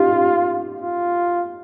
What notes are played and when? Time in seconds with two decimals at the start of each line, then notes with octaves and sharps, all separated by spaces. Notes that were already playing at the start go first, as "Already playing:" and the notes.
Already playing: D#4 F4 G4
0.11 G4
0.82 F4